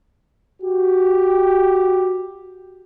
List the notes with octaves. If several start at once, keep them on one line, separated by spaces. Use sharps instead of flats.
F#4 G4